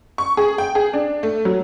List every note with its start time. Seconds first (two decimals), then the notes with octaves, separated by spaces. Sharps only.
0.18 C#6
0.37 G#4
0.58 G5
0.75 G#4
0.93 D4
1.23 A3
1.45 F#3